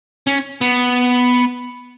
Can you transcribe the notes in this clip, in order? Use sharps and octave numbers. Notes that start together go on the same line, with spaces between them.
C#4
B3